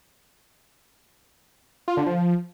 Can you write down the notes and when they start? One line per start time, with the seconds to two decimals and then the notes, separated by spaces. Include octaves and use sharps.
1.88 F4
1.97 D3
2.06 F3